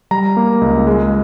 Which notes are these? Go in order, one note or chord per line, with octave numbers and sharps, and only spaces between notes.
G3 A#5
A#3
C#2
G#3